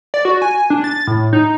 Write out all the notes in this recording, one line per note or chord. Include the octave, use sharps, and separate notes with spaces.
D5
F#4
G#5
D4
A6
A2
D#4